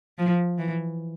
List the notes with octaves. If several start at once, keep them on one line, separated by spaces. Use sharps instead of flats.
F3
E3